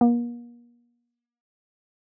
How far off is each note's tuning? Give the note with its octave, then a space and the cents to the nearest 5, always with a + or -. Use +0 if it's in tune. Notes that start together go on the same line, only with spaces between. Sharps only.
A#3 +40